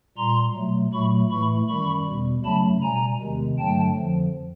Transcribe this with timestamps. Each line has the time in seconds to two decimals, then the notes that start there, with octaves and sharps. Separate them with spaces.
0.17 A#2 G3 A#5 C6
0.56 B2 F#3 A3
0.93 A#2 F#3 A3 B5 C#6
1.31 A2 E3 A3 B5 C#6
1.69 F#2 D#3 G3 B5 C#6
2.06 E2 B2 G3
2.45 F#2 C#3 F#3 A3 A5 B5
2.82 B2 G3 G#5 A#5
3.21 E2 C3 D#3 G#3
3.58 G2 D3 F#3 A3 G5 A5
3.96 F2 D3 F3